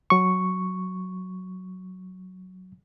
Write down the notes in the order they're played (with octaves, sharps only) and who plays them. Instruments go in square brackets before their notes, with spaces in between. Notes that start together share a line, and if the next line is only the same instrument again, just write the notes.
[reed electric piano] F#3 C#6